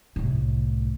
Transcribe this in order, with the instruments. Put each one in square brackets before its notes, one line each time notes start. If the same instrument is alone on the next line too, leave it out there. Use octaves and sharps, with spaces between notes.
[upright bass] C2 A2